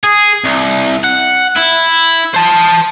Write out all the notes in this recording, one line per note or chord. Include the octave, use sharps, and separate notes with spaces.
G#4
C2
F#5
E4
C5 A5